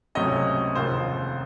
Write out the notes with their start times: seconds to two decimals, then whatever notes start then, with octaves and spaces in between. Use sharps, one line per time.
0.15 C#2 C3 F#3 A3 C#4 D#5
0.75 F1 D#2 C#3 F3 C4 C5